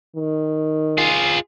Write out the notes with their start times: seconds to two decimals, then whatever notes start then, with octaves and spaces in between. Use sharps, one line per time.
0.16 D#3
0.98 F4 G#4